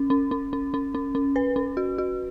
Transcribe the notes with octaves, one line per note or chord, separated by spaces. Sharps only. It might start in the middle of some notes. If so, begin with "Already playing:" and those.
Already playing: C#4
C#4
C#4
C#4
C#4
C#4
C#4
B4
C#4
F#4
F#4